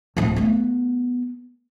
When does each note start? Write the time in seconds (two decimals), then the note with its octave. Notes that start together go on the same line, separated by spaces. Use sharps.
0.17 D1 F3
0.36 A3 B3